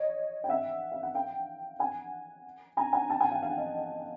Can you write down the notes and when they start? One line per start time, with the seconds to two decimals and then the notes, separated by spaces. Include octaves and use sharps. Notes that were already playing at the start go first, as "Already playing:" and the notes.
Already playing: C#5 D#5
0.44 G5
0.49 E5 F#5
0.92 F5
1.03 F#5
1.14 F5 G5
1.79 F#5 G#5
2.77 G#5 A#5
2.93 F#5 G#5
3.10 G5 A5
3.20 F#5 G#5
3.31 F5 G5
3.42 F5
3.50 F#5
3.57 D#5 F5